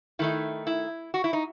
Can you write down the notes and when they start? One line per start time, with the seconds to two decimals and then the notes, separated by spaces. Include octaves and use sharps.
0.19 D#3 A3 D#4 E4
0.67 E4
1.14 F#4
1.24 E4
1.33 D#4